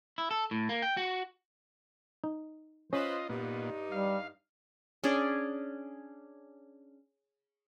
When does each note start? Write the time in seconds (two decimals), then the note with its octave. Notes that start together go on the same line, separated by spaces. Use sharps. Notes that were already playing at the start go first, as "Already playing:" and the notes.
0.18 E4
0.31 A4
0.51 A2
0.69 A#3
0.82 G5
0.97 F#4
2.24 D#4
2.93 C#4 F4 B4 C5 D#5
3.29 G2 A#2 B3 D#4
3.92 G3 F5
5.04 C#4 D4 G#4 D5